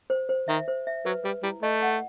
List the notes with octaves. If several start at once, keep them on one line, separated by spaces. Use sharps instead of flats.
C5
C5
D#3 E5
C5
E5
F#3 B4
G3 B4
G3 E4
A3 D#5
F#5